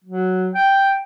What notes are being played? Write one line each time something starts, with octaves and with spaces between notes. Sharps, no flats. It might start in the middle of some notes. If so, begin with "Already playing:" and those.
F#3
G5